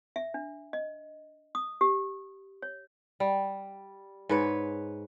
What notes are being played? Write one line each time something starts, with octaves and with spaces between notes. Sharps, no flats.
E5
D4
D#5
D#6
G4
C#5
G3
G#2 B4 C#5